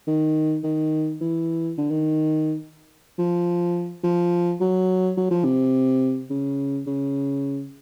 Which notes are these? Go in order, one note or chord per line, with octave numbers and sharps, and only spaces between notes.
D#3
D#3
E3
D3
D#3
F3
F3
F#3
F#3
F3
C3
C#3
C#3